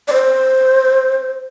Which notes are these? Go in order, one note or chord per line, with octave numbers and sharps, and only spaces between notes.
D5
C5